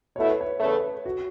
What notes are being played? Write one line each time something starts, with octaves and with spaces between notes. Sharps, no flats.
B2 A3 E4 C#5
B4
C#5
E2 C#3 A3 B4
F#4